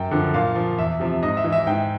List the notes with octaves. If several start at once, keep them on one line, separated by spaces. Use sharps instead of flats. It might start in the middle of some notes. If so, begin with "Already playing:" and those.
Already playing: F#2 G5
D3 F3
A#2 F5
F3
E2 E5
C3 F3
G#2 D#5
E5
E3
E5
G#2 G5